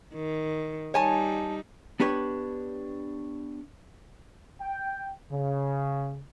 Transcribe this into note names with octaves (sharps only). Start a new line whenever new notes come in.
D#3
G3 D#4 C#5 G#5 A5
B3 D4 G4 B4 C#5
G5
C#3